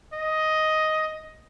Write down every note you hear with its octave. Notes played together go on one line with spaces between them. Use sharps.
D#5